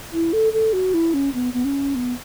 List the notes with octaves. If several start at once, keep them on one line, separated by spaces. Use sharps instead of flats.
E4
A4
A4
F#4
E4
C#4
B3
B3
C#4
B3